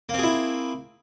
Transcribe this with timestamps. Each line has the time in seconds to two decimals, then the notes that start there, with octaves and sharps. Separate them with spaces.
0.09 A#3
0.14 C4
0.19 G#4
0.23 E4